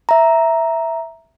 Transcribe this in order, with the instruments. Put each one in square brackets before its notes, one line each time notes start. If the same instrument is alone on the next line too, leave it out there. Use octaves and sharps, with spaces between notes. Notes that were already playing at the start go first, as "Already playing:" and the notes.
[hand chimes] E5 A#5